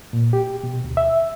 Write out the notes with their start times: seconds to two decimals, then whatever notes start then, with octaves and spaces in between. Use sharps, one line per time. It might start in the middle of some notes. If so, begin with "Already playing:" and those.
0.13 A#2
0.33 G4
0.63 B2
0.84 D2
0.97 E5